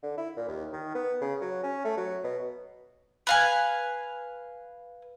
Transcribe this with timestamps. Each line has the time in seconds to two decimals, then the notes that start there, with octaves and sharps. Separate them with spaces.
0.03 D3
0.18 E4
0.37 A#2
0.48 D#2
0.73 D#3
0.95 B3
1.21 C#3
1.42 F#3
1.64 C#4
1.85 A3
1.97 F#3
2.24 B2
3.27 B4 F5 G#5